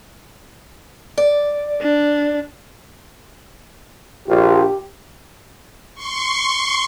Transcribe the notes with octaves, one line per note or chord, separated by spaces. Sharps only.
D5
D4
A#1 F4 G4
C6 C#6